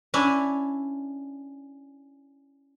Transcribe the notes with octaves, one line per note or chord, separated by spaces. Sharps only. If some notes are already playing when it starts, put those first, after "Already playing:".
C#4 D4 E4